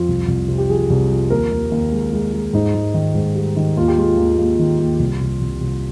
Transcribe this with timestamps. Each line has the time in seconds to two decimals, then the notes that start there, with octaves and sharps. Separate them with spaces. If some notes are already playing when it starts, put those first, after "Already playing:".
Already playing: F2 F4
0.08 C2
0.28 C2
0.48 C3
0.58 G4
0.70 F3 G#4
0.90 C2
1.10 F3
1.30 D#2 A#4
1.52 D#2
1.72 D#2
1.92 G#3
2.13 G#3
2.34 G#3
2.53 G#2 D#4
2.75 G#2
2.94 D#3
3.15 G#2
3.35 G3
3.57 D#3
3.77 D#2 F4
3.88 G4
3.98 G#3 F4
4.17 D#2
4.38 D#2
4.59 D#3
4.79 D#2
4.99 C2
5.21 C2
5.41 C2
5.61 C2